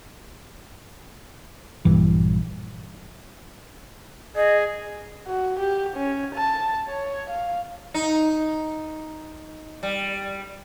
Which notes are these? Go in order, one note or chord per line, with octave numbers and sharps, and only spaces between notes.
A#1 G2 E3
G#4 D#5
F#4
G4
C#4
A5
C#5
F5
D#4
G3